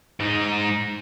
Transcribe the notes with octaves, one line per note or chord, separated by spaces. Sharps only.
G#2 D#4